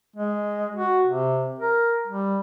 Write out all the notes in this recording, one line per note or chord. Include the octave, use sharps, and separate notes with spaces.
G#3
F#4
C3
A#4
G3